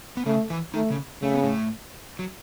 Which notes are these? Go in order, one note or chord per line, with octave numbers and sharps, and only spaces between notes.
B3
C#3 A3 C#4
E3 E4
D#3 A3 D#4
C#3 C#4
C#3 A3
B3
A2 A3
F#3